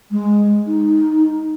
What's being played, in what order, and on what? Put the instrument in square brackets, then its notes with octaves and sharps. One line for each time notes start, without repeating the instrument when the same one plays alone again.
[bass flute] G#3
D#4